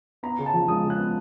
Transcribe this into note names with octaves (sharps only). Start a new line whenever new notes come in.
B3 A#5
C#3
A5
F3
G#3 D#6
C#3
F#6
B3